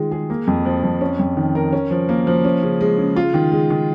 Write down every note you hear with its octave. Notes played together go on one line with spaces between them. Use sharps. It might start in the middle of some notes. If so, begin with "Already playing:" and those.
Already playing: D#3 G#3 F4
G#4
A#3
F2
F3
F2
C#4
F2
D#3
A#4
C#4
F3
A#3
F3
C#4
C#3
G#3
C#3
F4
D#3
G#3
D#3